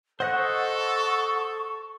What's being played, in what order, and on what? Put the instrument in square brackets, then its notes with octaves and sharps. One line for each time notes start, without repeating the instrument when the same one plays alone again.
[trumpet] A4 [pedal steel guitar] C5 D#5 F#6 [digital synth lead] F#5 [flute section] C#6